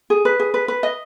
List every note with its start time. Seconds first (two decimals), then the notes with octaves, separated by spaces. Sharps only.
0.10 G#4
0.25 B4
0.40 G#4
0.54 B4
0.68 B4
0.83 D#5